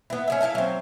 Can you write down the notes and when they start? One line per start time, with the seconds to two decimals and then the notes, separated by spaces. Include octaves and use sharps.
0.10 B3 E4
0.28 C#4 E4 E5
0.41 A3 D4 E4 F5
0.55 F#3 C4